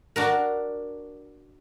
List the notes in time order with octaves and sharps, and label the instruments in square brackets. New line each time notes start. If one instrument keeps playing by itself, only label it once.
[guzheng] D4 F#4 A#4